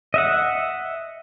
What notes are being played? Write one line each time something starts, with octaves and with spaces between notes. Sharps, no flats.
D#5 E5 F#5